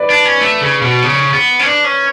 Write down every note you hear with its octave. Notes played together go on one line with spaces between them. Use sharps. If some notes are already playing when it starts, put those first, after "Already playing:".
Already playing: B4 D5
D4
C#4
A3
C#3
B2
C#3
B3
C#4
D4
C#4